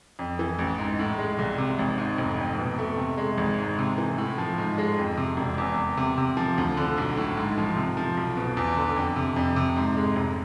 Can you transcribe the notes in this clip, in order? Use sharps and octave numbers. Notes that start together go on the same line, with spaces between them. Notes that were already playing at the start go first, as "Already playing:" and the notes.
F2
E3
A1
G#2
A2
G#3
C2
C3
G#1
G#2
F1
F2
B2
A3
C3
G#3
G#1
G#2
C3
E3
A2
F3
G#2
G#3
F2
C3
E1
E2
E2
C3
C3
F3
D2
D3
B1
A2
G#2
F3
C3
F3
B1
B2
E2
D3
F2
C3
F2
C3
G#2
G#3
F1